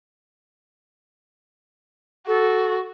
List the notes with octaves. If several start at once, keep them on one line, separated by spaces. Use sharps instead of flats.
F#4 A4